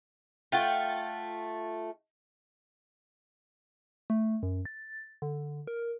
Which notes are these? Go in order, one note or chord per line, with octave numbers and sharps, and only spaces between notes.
A3 F4 F#5 G5
A3
F#2
A6
D3
A#4